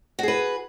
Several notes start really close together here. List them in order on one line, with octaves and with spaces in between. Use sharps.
F#4 G#4 B4